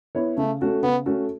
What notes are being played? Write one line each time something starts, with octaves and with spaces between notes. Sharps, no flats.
B3 E4 C#5
C#3 A3
A3 C#4 F#4 A4
C#3 B3
A3 C#4 F#4 A4